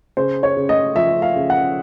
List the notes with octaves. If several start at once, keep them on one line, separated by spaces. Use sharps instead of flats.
C#3 C5
C#5
C#3
D#5
F3 E5
F5
C#3
F#5